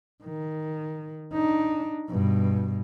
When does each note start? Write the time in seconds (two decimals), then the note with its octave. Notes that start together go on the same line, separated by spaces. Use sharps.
0.24 D#3
1.33 D4 D#4
2.09 G2 B2